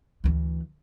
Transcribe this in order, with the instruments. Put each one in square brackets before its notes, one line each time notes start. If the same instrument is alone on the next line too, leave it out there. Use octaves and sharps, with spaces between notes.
[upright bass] D2 E3